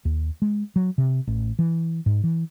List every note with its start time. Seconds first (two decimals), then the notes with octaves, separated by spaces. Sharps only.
0.05 D#2
0.42 G#3
0.76 F#3
0.98 C3
1.27 A1
1.59 E3
2.06 G#2
2.24 E3